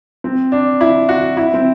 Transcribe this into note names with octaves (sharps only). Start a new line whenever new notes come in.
C4
D4
E4
F#4
E4
C4